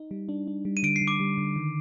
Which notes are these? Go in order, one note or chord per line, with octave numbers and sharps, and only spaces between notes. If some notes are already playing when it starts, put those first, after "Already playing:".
Already playing: D#4
G3
D4
D4
G3
D#7
D3 D7
C7
D3
D6
G3
D3
D#3